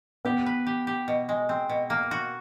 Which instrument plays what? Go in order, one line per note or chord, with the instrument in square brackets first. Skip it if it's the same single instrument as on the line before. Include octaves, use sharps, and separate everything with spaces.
[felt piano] B3 [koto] G4
[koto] B4
G4
G4
B2
G#3
C4
B2
A#3
F#4